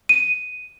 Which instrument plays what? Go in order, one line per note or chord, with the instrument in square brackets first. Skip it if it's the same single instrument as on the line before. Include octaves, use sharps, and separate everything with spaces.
[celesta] D#7